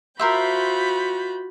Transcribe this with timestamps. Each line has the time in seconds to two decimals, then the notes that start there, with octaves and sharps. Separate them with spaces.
0.19 F4 F#4 A#4 C5 E5 B5 G6